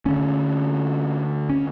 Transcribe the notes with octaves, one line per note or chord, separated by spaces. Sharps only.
D2 D3 C#4
C#4